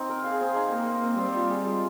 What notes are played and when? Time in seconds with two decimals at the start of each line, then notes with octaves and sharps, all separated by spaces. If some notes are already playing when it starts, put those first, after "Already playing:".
Already playing: C4 D#4
0.09 A#4
0.24 G#4 F5
0.41 C4
0.56 D#4
0.71 A#3 A#4
0.87 F5
1.03 C4
1.18 G3 C4
1.35 F4
1.50 G#4
1.66 G#3